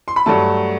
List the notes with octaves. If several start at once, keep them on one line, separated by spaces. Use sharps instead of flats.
C6
B5
G2 F#3 A3 A5